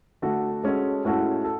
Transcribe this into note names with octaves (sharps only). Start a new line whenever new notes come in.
D3 A3 D4 F#4 A4
G#3 C#4 F#4 A4
A2 G#3 C#4 F#4 A4
A4